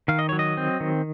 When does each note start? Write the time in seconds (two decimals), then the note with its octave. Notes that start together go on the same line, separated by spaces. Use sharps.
0.08 D#3 F5
0.19 D#5
0.29 F#3 C#5
0.39 D#5
0.57 C4
0.80 D#3